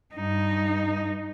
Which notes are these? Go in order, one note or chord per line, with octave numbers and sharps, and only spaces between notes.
G2 D#4